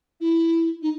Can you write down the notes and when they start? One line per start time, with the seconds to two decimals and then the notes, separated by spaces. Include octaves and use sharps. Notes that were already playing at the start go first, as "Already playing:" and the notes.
0.21 E4
0.82 D#4